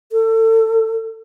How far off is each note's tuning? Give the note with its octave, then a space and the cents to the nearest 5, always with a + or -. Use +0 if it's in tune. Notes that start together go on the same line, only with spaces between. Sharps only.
A4 +30